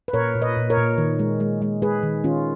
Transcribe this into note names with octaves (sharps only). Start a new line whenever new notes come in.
B4
A#2 A#4 C#5
A#2
B4 D#5
A#2
A#4 C#5
A#2
D#3
G#3
G#3
G#3
G#3 G#4 B4
D#3
D#3 C#4 F4